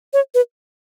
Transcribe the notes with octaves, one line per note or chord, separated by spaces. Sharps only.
C#5
B4